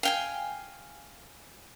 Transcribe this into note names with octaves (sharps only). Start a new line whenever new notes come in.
F5 G5 G#5